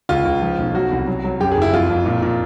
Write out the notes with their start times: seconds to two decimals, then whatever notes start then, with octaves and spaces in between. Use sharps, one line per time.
0.09 C#2 F4
0.25 C#2
0.42 F3
0.58 B1
0.75 F#3 F#4
0.91 C2
1.07 F#3
1.24 F#3
1.40 F#2 G4
1.52 G#4
1.57 F#1 E4
1.73 F2 F4
1.89 F2
2.06 A#2
2.22 A#2